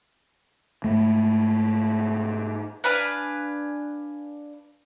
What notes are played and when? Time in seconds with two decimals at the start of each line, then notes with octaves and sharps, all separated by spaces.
0.84 G#2 A3
2.84 D4 B4 F5 G#5